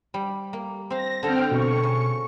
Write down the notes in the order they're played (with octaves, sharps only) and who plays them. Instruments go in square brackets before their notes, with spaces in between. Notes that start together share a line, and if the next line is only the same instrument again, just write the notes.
[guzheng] G3
A#3
[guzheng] C4 F5 [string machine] A#6
[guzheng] D3 A4 [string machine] C4 G5 F6
[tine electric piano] B2 [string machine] C#6
[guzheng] C#3